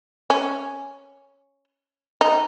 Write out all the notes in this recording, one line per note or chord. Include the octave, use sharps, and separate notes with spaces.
C#4
D#4